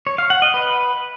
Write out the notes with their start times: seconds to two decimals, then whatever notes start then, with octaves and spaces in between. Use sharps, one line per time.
0.07 C#5
0.18 F5
0.30 F#5
0.42 D#5
0.54 B4